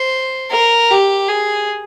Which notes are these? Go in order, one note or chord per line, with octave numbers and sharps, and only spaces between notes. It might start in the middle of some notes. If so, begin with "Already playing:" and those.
Already playing: C5
A#4
G4
G#4